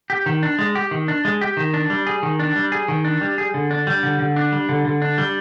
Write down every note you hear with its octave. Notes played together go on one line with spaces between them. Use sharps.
G4
D#3
D4
G#3
G4
D#3
D4
G#3
G4
D#3
D4
G3
G#4
D#3
D4
G3
G#4
D#3
D4
G3
G#4
D3
D4
G3
D3
D3
D4
G3
D3
D3
D4
G3